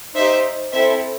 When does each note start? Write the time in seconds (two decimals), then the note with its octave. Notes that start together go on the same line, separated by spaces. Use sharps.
0.16 D#4 G4 C5 E5
0.73 C4 E4 A4 C5 E5